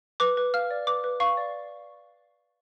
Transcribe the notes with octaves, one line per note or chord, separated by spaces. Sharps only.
B4 D6
B4
F5 F6
D5
B4 D6
B4
F5 C#6
D5